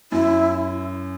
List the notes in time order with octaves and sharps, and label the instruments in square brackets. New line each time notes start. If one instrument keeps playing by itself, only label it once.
[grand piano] F#2 [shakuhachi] E4